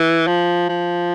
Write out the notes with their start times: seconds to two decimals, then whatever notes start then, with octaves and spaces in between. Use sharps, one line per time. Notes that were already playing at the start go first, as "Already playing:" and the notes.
Already playing: E3
0.27 F3
0.69 F3